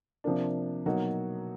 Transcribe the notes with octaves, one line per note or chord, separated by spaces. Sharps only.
C3 F3 A#3 D4
B2 F#3 A#3 D#4 F#4